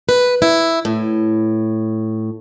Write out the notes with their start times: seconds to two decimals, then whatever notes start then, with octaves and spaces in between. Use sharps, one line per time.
0.09 B4
0.42 E4
0.85 A2